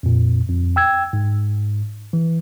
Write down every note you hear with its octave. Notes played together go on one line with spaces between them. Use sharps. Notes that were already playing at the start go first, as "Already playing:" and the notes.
F2 A#2
F2
G5 E6 G#6
G#2
E3